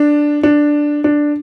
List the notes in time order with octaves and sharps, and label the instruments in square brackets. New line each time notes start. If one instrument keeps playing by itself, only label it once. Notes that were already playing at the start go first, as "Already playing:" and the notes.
Already playing: [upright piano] D4
D4
D4